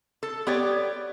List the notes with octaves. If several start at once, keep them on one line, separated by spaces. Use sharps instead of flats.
A4
B3 G4 C#5 D5